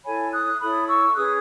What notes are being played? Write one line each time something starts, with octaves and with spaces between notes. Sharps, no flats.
E4 A4 C#5 G#5 B5
D#6 F#6
E4 A4 C#5 B5 D#6
C#6 E6
C#4 G#4 B4 D#6 F#6